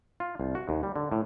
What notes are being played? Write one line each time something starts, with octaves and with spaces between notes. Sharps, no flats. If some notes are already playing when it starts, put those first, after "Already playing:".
F4
C2
F#4
D#2
G3
D3
A2